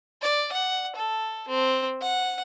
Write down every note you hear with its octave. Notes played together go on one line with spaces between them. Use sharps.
D5
F#5
A4
C4
F#5